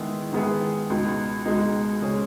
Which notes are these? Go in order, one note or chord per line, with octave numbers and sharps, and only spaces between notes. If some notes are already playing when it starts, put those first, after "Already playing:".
Already playing: D#3 G#3 B3 E4 G#4
D#3 G#3 B3 E4 G#4
C#2 B2 G#3 D#4
C#2 B2 G#3 D#4
C#3 G#3 C#4 G#4